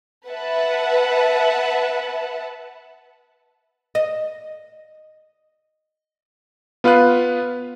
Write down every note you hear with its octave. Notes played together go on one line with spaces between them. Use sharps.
B4 E5 F#5 A5
D#5
B3 F4 B4 F5 F#6